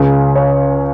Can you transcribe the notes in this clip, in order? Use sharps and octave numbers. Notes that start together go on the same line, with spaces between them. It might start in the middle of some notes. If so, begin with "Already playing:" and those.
Already playing: C#2 C#3
C#5